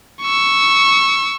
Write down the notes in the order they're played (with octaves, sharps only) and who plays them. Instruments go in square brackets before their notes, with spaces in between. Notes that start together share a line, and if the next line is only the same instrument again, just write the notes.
[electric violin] C#6 E6